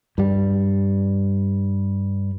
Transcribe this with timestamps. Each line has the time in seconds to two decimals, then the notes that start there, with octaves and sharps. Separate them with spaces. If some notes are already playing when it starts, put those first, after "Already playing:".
0.18 G2 G3